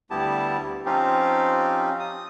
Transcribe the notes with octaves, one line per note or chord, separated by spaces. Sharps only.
D2 G3 B3 E4 G4 A5
F3 C4 C#4 D#4 F4 G4
D#6